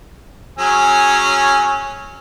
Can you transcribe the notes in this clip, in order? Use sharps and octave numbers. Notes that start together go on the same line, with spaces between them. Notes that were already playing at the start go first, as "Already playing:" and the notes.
F#3 C#4 G#4